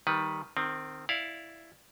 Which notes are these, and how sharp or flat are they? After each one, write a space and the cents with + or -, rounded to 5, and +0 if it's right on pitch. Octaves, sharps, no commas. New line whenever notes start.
D#3 +10 G3 +0 B4 +0
D#3 -20 C4 +0
E4 +0 D5 +0 F5 +10